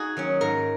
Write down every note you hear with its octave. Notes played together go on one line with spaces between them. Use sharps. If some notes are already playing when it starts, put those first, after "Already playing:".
Already playing: D#4 F#4 G#4
D#3 F#3 C#4
G#2 A#4